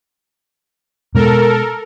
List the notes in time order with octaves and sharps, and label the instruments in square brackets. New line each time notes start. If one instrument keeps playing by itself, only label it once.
[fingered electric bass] B2 G#3 [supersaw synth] A4 A#4